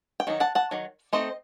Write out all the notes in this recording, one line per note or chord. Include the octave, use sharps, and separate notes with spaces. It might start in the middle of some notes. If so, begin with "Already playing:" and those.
G5
D#3 F#3 D#4
F#5 A5
F#5 A5
D#3 F#3
A3 C4 D#4 C5 D#5